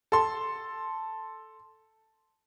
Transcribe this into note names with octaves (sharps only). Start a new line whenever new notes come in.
A4 C6